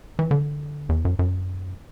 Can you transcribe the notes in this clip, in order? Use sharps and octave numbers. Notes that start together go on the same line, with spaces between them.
E3
D3
E2
F#2
F#2